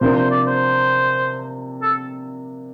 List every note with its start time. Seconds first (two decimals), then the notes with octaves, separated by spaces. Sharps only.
0.01 C3 F3 A#3 D4 C5
0.16 C5
0.31 D5
0.47 C5
1.82 A4